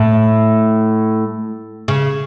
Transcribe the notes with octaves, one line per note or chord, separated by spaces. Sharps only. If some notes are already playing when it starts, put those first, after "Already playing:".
Already playing: A2
C#3